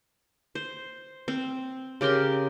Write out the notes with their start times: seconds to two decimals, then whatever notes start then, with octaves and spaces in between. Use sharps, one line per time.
0.55 C5
1.28 C4
2.01 C#3 G4 A#4 C6